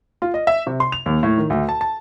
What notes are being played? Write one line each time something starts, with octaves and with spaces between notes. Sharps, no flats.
F4
D#5
E5
C3
C6
F7
D#2
A2
D#3
D2
A5
A5